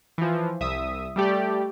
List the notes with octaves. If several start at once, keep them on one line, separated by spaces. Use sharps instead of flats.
E3 F3
C2 E5 D#6
G3 A3 G4 D5